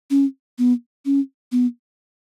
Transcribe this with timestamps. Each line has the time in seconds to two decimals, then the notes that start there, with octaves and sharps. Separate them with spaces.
0.10 C#4
0.58 B3
1.05 C#4
1.52 B3